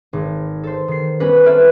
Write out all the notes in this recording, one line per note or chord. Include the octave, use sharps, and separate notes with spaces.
G#1
A4 C5
D#3 C7
G3 B3 C#4 F#4 B4
C4 A4 B4 E5 F6